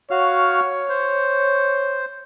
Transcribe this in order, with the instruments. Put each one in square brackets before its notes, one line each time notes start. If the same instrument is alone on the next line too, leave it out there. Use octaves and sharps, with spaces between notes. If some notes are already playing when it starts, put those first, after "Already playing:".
[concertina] F#4 F5 F6 [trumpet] C#5
[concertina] C5